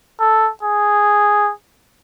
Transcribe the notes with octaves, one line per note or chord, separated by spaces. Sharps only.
A4
G#4